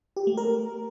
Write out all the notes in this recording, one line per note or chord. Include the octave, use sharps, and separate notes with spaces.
G4
A3
A#4